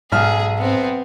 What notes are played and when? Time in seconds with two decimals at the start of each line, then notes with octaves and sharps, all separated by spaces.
0.12 B1 G#2 G#4 F6
0.59 B3 C4